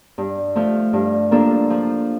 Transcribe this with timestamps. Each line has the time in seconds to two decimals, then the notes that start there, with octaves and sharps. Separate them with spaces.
0.18 G2
0.56 F3 A3
0.93 G2
1.31 F3 A#3 D4 A4
1.70 F3